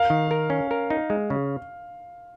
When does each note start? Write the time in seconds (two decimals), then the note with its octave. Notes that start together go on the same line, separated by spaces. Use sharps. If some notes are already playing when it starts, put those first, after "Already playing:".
Already playing: A#4 F5
0.10 D#3
0.31 A#4
0.50 C#4
0.71 A#4
0.90 D#4
1.10 G#3
1.30 C#3